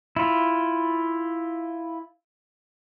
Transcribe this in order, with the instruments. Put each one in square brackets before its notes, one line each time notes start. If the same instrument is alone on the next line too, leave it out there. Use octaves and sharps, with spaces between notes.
[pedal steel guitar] E4 F4